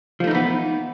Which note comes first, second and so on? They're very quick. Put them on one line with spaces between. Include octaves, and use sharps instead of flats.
F3 A3 D#4 E3 B3